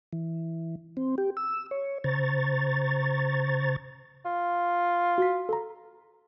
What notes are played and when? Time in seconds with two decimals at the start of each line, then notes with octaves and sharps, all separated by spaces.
0.13 E3
0.97 C4
1.18 G4
1.37 E6
1.71 C#5
2.04 C#3 C5 A#5 C#6 A6
4.25 F4
5.18 F#4 B6
5.49 A4 A#5